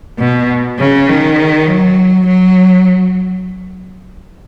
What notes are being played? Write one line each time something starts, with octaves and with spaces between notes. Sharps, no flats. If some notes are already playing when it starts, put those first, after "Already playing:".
B2
C#3
D#3
F#3
F#3